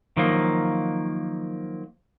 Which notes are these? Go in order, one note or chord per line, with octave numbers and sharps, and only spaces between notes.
D#3 F3 F#3 A#3